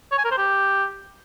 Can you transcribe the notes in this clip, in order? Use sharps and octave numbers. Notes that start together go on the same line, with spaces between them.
C#5
G#5
A#4
C5
G4